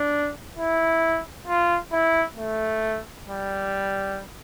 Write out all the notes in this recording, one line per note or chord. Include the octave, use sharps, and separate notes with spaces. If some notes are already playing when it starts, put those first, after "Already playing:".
Already playing: D4
E4
F4
E4
A3
G3